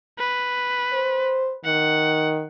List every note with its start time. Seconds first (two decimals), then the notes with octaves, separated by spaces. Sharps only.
0.19 B4
0.93 C5
1.65 D#3 F#5